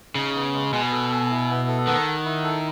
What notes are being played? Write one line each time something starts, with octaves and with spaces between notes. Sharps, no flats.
C#3 D#4
B3
G#3
B2 G#5
A4
G#5
E4
B3
A4
D#3 F#5
F#5
E4
A4